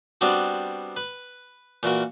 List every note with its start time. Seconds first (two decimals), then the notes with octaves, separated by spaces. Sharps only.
0.21 G3 B3 C4 D4 F#4
0.96 B4
1.83 A#2 E3 F#4 A#4